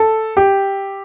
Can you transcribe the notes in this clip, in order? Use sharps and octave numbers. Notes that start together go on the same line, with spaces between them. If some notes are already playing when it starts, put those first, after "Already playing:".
Already playing: A4
G4